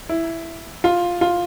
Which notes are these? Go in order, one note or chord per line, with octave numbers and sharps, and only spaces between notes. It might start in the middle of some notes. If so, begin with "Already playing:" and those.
E4
F4
F4